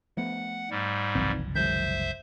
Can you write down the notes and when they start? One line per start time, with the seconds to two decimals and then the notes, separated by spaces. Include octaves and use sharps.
0.17 F3 A3 B3 F#5
0.70 G#2 G3
1.15 F#1 C2 E3 F3 C4
1.55 D#3 F#3 G#3 C5 E5 G6